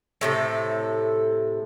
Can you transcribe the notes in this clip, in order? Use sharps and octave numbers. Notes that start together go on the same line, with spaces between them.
A2 C3 A4